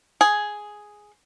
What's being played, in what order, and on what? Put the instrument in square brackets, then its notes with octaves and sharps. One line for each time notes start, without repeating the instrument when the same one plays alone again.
[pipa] G#4